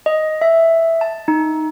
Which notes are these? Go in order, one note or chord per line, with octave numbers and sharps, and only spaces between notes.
D#5
E5
A5
D#4